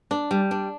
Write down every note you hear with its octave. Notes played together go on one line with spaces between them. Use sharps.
D4
G3
D4